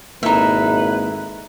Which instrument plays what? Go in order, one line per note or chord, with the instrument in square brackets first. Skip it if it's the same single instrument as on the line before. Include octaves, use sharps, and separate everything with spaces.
[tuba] G#1 [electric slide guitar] A#3 E4 A4 [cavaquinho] D#4 E5 [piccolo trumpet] B4